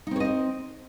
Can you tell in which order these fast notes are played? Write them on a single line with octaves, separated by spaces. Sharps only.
D#4 C4 C#5 D#5 C5